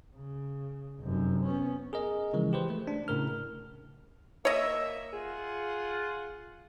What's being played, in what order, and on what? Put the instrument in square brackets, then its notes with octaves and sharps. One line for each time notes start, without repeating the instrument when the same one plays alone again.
[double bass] C#3
F1 F#2
B3 C#4
[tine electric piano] G#4 A#4 D#5
C#3 E3 F3 G#3
G4 B4 C5
A3
D4
A2 C#3 A#4 F6
[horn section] A#3 E5 [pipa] C#5 D#5
[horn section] F4 G#4 F#5